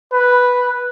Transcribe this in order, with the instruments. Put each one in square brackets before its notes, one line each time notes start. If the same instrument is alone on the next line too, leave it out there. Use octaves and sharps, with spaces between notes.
[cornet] B4